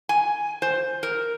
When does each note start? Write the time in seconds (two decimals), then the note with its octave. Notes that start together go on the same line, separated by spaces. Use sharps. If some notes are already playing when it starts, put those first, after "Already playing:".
0.09 G#5
0.62 C5
1.03 A#4